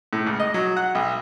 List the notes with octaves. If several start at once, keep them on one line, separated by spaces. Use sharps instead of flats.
A2
C#2
D#5
F#3
F#5
B1